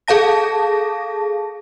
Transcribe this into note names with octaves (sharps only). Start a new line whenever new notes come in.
G#4 A4 F5 A5 A#6